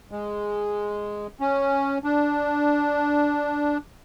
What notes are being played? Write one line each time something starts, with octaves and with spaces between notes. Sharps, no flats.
G#3
C#4
D4